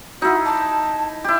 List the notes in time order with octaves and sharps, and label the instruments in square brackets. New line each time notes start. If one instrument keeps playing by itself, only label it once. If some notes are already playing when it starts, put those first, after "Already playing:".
[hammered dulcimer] D#4 E4 [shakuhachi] F#4
[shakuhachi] A5
[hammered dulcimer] E4 G4